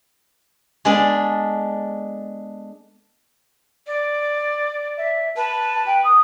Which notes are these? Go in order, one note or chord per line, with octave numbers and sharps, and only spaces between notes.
G#3 B3 D4 G#4 A4
D5
E5
B4 A5
G5
D#6